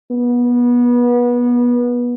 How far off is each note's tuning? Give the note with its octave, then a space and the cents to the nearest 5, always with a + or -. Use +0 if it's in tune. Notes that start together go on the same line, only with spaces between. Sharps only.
B3 -25